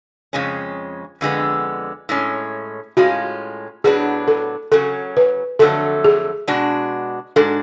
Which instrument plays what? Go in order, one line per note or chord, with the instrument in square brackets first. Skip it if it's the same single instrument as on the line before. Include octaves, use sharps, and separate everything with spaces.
[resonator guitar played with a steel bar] F2 C#3 G#3 C#4
F2 D3 G#3 B3
A2 G#3 C#4
[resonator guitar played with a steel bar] A2 G#3 C#4 F4 [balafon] F#4
[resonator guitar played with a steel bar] A2 F#3 B3 D4 [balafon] G#4
[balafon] A4
[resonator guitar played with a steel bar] C#3 F#3 C#4 [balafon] A4
[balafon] B4
[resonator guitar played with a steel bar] F2 D3 F#3 A3 [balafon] A4
[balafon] G#4
[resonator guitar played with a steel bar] B2 G#3 D4 F#4
[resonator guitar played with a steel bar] G#2 G#3 D4 F#4 [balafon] A4